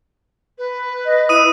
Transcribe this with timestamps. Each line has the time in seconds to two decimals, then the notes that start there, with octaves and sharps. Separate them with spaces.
0.58 B4
1.06 D#5
1.29 E4 D#6 D#7